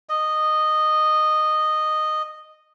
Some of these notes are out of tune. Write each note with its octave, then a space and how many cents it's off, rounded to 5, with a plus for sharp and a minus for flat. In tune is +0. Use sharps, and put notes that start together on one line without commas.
D#5 -10